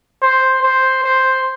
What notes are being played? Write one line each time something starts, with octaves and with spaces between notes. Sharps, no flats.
C5
C5
C5